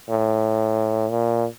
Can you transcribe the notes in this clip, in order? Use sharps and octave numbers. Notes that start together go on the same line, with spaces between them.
A2
A#2